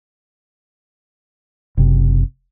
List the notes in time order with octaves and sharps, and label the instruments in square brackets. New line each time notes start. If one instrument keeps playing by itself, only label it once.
[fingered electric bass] F#1 C3